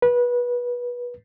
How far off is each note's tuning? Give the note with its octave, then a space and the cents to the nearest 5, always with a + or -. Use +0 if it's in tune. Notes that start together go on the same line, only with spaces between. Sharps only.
B4 -25